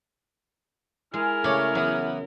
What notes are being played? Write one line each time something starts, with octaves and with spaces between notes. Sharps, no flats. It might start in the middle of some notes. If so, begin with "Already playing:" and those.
G#3 E4 G#4 A#4 G#5 F6
C#3 A3 C#5 D5
E3 F#3 B3